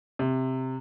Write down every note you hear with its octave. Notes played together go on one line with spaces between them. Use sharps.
C3